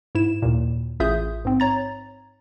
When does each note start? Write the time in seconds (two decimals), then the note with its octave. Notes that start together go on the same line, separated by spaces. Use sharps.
0.15 G#2 E4 E7
0.42 D#2 A#2
1.00 A1 F4 G#4 E5 D#6 G6
1.45 G#2 C4
1.60 C#5 A#5 A6